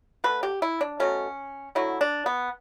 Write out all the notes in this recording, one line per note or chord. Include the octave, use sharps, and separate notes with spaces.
D3 A3 B4
G4
E4
D4
B2 F#3 A3 C#4
D3 F#3 A3 E4
D4
B3